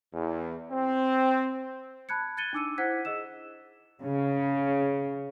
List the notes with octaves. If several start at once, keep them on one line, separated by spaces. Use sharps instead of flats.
E2
C4
A5 B5 F#6 G#6 C#7
F#6 G#6 A6 C#7 D#7 G7
D4 D#4 D6 E6 C#7 D#7
E4 C5 F#5 F#6 G#6 B6
G#4 D#5 E6 E7
C#3